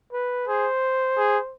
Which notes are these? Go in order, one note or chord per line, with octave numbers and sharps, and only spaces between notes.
B4
G#4 C5
G#4